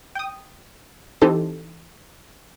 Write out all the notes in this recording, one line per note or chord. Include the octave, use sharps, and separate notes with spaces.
G5 D#6
E3 C4 D#4 G4 A4 C5